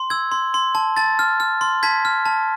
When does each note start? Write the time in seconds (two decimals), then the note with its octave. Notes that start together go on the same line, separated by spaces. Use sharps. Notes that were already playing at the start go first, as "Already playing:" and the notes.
Already playing: C6
0.10 E6 G#6
0.32 C6
0.54 C6
0.75 A5
0.97 A5 A6
1.19 F6
1.40 F6
1.61 C6
1.83 A5 G#6 B6
2.05 F6
2.26 A5